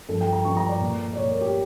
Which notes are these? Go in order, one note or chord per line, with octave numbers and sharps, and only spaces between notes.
G2 F3 A3 A4
G5
A#5
G2 F3 A3 C#6
A#5
D5
A#2 A3
D5
A#2 A3 C#5
A#4
G4